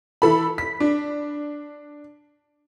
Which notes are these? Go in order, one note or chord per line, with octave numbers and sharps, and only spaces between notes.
E3 A4 B5
B6
D4